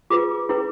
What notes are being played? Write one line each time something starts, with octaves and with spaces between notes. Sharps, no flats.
F4 G#4 B4 D6
C#4 E4 G#4 B4